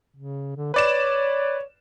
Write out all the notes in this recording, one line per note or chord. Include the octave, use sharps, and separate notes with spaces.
C#3
D3
B4 C#5 D5 E7